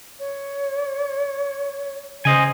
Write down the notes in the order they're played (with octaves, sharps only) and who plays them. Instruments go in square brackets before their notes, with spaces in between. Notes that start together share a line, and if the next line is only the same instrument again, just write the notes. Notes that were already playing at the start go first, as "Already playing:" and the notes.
[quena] C#5
[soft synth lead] C#3 [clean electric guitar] C5 D#5 G#5